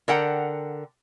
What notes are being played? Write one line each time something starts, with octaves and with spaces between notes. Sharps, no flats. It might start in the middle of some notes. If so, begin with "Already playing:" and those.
D3 A#4 F#5 G5